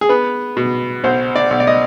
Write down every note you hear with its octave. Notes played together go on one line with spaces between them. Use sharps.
G#4
B3 B4
B2
B1 C5
D5
B1
D5
D#5